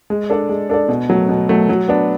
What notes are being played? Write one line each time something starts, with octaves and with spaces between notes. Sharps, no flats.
G#3
D4 A4 D5
G#3
D4 A4 D5
B2
F#3 A3
B2
F#3 A3
F#3
B3 D4